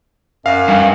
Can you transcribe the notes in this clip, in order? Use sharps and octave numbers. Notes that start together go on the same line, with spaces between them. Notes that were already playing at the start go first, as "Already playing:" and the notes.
F#2 F5
G2